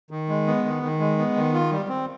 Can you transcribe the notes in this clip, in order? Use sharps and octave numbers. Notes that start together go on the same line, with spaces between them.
D#3
G#3
B3
D#3
D#3
G#3
B3
D#3
F4
G3
C4